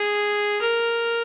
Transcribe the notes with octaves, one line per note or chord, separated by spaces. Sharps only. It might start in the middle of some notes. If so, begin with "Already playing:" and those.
Already playing: G#4
A#4